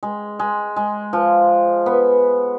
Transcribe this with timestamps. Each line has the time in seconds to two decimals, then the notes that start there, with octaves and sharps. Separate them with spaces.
0.03 G#3
0.39 G#3
0.76 G#3
1.13 F3
1.86 B3